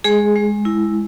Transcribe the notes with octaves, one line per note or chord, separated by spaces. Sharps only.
G#3 G#4
G#3
E4